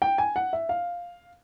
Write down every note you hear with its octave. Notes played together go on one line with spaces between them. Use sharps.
G5
G#5
F#5
E5
F5